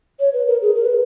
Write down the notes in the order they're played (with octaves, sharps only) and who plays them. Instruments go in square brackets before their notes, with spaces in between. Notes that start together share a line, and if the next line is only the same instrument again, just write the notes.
[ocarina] C#5
B4
A#4
G#4
A#4
B4